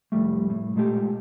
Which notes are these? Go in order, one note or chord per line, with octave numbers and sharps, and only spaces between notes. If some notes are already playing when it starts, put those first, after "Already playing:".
C2 F2 G3 A3
A2
A#2 G#3 A3 G4